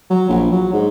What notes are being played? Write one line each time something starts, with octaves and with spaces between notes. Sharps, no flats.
F#3
A#1
F#3
G#2